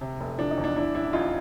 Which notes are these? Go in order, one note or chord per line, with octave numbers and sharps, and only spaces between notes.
C3
F1
F3 D4
D#4
E2
D4
E3 D4 E4
A1 D4 E4
A1 D#4 F4